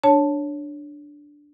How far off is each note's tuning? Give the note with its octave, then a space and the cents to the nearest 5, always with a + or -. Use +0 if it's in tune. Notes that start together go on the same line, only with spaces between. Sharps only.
D4 +0 C#5 +0 A5 +0